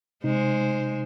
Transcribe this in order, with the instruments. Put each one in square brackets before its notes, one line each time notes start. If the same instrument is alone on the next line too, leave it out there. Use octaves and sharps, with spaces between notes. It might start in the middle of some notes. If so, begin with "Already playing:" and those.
[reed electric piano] C3 D#4 [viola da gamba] G#3 C5